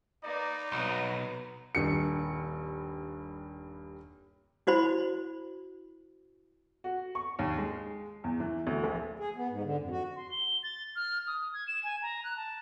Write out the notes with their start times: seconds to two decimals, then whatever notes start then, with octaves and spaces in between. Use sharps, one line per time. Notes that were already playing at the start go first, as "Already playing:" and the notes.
0.23 A#3 D#4 B4 D5
0.72 B1 F#3 B3 A#5
1.75 D#1 G2 C#7
4.67 E4 F#4 C5 B5
6.84 F#4
7.15 C#6
7.39 D#2
7.58 G#3
8.24 E2
8.40 E3
8.67 D2
8.84 A#1
9.19 G#4
9.36 B3
9.50 G#2
9.63 D3
9.78 F2
9.90 F#4
10.16 C6
10.31 G7
10.63 A6
10.96 F6
11.27 D#6
11.54 G#6
11.68 E7
11.83 G#5
12.02 A#5
12.24 F#6
12.36 A5